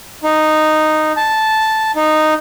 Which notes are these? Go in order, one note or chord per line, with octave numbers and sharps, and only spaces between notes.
D#4
A5
D#4